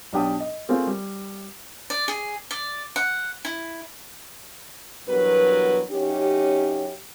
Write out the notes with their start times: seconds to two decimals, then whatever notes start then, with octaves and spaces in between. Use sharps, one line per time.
0.13 B1 D4 G4 G5 D#6
0.40 D#5
0.69 A3 A#3 C4 F4 G#4 C5
0.87 G3
1.90 D5
2.08 G#4
2.51 D5
2.96 F#5
3.45 E4
5.07 E2 G2 B2 F#3 A#4 B4
5.91 F#2 C#4 D#4 G4